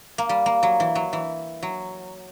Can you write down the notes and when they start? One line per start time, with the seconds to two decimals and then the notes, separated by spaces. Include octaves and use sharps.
0.18 A#3
0.29 G3
0.46 A#3
0.63 F#3
0.80 E3
0.95 F#3
1.13 E3
1.63 F#3